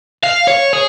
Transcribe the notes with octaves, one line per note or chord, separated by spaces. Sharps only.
F5
C#5
G#4